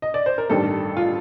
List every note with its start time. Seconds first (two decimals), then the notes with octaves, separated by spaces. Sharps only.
0.02 D#5
0.14 D5
0.26 C5
0.38 A#4
0.50 A1 G2 D#3 G3 A4
0.97 F4